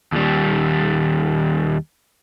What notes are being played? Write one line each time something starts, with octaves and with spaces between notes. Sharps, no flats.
D#2 G3